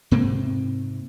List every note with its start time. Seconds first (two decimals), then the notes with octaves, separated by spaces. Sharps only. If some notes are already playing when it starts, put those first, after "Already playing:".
0.11 G#2 C3 A#3 C4